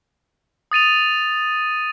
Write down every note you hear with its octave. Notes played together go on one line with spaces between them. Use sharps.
D#6 A6 D#7 F7